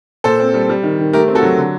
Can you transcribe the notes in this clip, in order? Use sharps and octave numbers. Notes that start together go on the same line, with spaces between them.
A#2 A4 C5
C4
G3
G3
D#3
D#3
A3 G4 A#4
C4
F#4 A4
F#3
D3